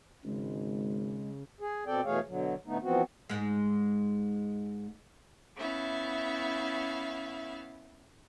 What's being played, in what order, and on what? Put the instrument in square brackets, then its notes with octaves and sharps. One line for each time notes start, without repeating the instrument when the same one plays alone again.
[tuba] G#1 [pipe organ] C#3 [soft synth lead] G#3
[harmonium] G#4
B2 C4 A4 D5 G5
B2 E3 A3 G#4 C#5 F5
B2 D3 F#3
A2 D3 A3 B3 D#4
E3 F3 B3 C4 F#4
[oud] G#2 G#3
[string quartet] B3 C#4 E4 E5 F5